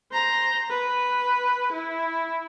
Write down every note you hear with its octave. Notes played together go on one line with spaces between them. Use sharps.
C5 A#5
B4
E4